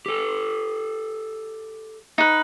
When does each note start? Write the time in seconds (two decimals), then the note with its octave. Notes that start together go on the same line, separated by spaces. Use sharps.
0.06 G4 A4
2.18 D#4 B4